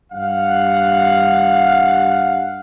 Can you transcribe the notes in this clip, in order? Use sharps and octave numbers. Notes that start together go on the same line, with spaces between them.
G2 F5 F#5